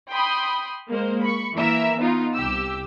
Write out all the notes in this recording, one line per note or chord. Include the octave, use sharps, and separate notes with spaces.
G5 B5 C6 D#6
G#3 A#3 C5
B5 C#6
E3 A#3 A#4 E5
B3 D#4 F4
C2 G4 E6